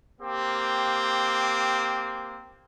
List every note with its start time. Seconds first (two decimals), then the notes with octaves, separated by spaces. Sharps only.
0.21 A#3 C4 G4